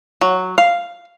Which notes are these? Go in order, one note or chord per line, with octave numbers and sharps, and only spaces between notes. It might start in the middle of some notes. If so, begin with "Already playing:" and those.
F#3
F5